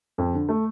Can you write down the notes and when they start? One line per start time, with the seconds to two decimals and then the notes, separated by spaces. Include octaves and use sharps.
0.18 F2
0.34 D3
0.49 A3